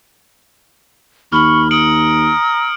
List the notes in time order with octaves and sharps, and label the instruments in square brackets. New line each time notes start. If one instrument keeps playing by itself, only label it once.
[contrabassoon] D#2 [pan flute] B5 [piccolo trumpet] C#6 [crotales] F6
[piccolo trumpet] A#5 [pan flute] D#6 [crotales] C#7 D7 F#7